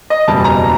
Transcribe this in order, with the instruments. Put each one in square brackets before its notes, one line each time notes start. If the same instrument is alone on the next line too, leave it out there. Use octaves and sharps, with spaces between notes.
[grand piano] D#5
F#1 E2 B2 G3 A5
A#5